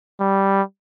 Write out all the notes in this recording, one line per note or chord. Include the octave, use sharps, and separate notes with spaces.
G3